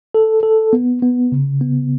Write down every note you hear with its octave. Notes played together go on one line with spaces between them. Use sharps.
A4
A4
B3
B3
C#3
B3